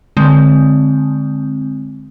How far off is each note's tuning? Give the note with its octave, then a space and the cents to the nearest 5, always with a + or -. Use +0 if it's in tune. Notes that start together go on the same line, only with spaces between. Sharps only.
D3 +0 G#3 +0 C4 +0